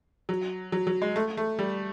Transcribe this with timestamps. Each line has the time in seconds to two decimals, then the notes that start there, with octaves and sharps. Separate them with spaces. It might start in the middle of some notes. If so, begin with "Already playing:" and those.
0.29 F#3
0.72 F#3
0.87 F#3
1.02 G#3
1.16 A3
1.37 A3
1.59 G3